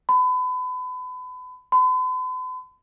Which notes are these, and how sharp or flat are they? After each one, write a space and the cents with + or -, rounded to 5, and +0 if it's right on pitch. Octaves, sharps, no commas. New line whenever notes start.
B5 +35
B5 +45